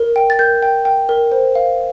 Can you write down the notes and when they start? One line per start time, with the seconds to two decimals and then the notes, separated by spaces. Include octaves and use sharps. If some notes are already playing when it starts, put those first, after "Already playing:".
Already playing: A#4
0.16 G5
0.30 A6
0.39 A#4 G6
0.62 G5
0.85 G5
1.09 A#4
1.32 C5
1.55 F5